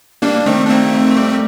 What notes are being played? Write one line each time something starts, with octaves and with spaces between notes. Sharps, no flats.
G3 A#3 D4
D4
D#3 A3 C4
D4
A3 A#3 C4
F2
G3